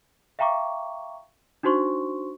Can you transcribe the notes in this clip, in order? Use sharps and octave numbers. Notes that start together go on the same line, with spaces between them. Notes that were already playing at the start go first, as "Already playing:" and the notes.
E5 F5 G5 A#5 C#6 D6
D4 D#4 F#4 C5 C6 C#6